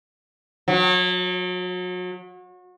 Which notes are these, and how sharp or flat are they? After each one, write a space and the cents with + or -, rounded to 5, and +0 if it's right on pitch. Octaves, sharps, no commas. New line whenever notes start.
F#3 -35